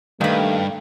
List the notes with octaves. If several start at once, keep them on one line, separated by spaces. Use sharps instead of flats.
G2 D#3 A3 A#3 B4